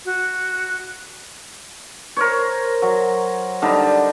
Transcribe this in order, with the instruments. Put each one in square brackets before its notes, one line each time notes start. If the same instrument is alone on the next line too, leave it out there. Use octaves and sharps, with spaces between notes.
[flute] F#4
[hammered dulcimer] A#4 C5 C#5
F#3
D3 G3 D#4